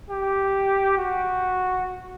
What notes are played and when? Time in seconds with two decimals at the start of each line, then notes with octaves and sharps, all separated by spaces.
0.11 G4
0.98 F#4